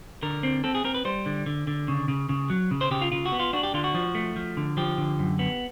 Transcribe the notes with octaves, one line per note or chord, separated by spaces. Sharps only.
D3 A#4
C4
C4 A4
G#4
C4 A#4
B4
G3 C5
D3
D3
D3
C#3
C#3
C#3
F#3
C#3
C5
C#3 G4
F4
C#3 F4
F#4
B3
F4
D4 F#4
G4
D3 F4
F#4
F3
A3
F3
D3
F3 G4
D3
F#2
B3